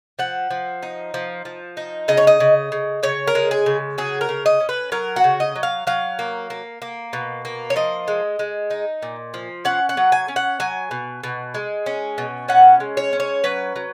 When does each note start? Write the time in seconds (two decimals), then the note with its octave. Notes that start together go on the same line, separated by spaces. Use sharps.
0.19 F3 F#5
0.50 F3
0.83 D#4
1.14 F3
1.45 F3
1.77 D#4
2.08 C#3 D#5
2.17 C#5
2.27 D#5
2.40 C#3
2.72 C#3
3.03 C#3 C#5
3.27 A#4
3.35 G#3
3.51 G#4
3.66 C#3
3.98 F#3 G#4
4.21 A#4
4.29 C#3
4.46 D#5
4.60 C#4
4.69 B4
4.92 F#3 A#4
5.16 F#4
5.24 C#3
5.40 D#5
5.55 F#3
5.63 F5
5.87 F#3 F5
6.19 A#3
6.50 A#3
6.82 A#3
7.13 B2
7.45 A#3
7.70 C#5
7.76 F3 D#5
8.08 G#3
8.39 G#3
8.70 D#4
9.02 A#2
9.34 F3
9.65 C#4 F#5
9.89 F#5
9.97 F#3
10.12 G#5
10.28 C#4
10.36 F#5
10.60 F#3 G#5
10.91 B2
11.23 B2
11.54 G#3
11.86 C#4
12.18 B2
12.48 C#4 F#5
12.80 G#3
12.97 C#5
13.13 C#4
13.20 C#5
13.44 F#3 B4
13.76 F#3